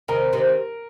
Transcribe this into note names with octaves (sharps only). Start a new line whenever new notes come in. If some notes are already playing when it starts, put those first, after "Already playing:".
C3 D#3 A#4
C3 D#3